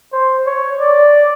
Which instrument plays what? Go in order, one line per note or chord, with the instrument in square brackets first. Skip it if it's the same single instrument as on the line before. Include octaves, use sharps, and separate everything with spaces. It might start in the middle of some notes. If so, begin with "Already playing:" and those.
[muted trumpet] C5
C#5
D5